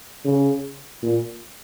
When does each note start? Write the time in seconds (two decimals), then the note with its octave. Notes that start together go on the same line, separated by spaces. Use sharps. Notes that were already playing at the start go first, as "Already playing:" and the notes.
0.25 C#3
1.02 A#2